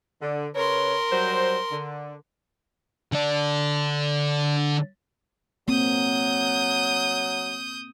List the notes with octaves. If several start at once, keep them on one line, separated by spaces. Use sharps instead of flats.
D3
C#3 A#4 B4 C#5 C6
F#3 G3 C5
D3
D3 D5
F#3 A#3 C4 D#6 G6